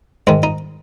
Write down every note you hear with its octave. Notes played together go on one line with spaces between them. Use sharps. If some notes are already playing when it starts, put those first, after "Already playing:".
G#2 D#3 G#3
D#4